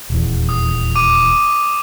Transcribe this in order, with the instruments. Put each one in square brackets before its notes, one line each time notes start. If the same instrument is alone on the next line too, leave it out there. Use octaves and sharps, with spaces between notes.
[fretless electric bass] D#1 E2
[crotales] D#6
D6 D#7